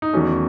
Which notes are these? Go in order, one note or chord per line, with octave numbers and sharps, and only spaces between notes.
D#4
E2 D#3 F#3 A3 C#4